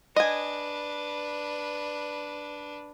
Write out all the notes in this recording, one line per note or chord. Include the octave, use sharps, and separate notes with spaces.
D4 B4 D#5 G#5